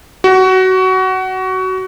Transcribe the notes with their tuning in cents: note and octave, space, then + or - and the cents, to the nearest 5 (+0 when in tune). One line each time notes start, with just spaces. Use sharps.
F#4 +20